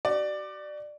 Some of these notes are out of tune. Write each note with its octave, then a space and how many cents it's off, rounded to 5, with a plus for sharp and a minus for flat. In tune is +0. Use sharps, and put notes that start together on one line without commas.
F#4 +45 D5 +15